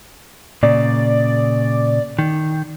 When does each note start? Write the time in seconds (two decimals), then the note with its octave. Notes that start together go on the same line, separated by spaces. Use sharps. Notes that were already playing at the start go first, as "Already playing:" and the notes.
0.63 A#2 C#3 D5
2.19 D#3